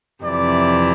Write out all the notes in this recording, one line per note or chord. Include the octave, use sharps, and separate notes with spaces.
F2 C3 E3 D5